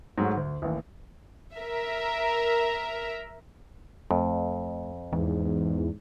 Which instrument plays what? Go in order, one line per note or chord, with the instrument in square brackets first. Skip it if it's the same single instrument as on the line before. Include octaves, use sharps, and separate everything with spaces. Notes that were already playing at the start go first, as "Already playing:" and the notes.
[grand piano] G#2 F#3 G#3 A3 F#4
D2
A1 D#2
[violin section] A#4 E5
[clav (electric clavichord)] F2 [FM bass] A3
[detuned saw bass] E2 [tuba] G#2 [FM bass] E3